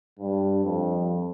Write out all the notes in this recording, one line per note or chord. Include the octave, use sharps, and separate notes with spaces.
G2
F2